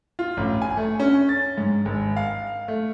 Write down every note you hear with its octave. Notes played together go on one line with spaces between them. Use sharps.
F4
A1
G#5
A3
C#4
A6
G#2
G#1
F5
A3